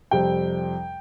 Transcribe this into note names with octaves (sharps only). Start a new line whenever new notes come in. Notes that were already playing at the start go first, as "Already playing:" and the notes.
F2 C3 G3 C4 G5